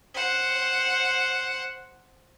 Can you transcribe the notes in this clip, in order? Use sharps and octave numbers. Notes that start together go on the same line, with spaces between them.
C5 F#5